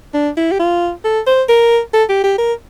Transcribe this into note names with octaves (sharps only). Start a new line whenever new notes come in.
D4
E4
G4
F4
A4
C5
A#4
A4
G4
G4
A#4